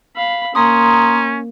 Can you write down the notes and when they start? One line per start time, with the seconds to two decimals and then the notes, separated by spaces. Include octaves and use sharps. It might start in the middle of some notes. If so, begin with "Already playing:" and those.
0.16 F5 B5
0.55 A#3 C#4 A#5 C6 D#6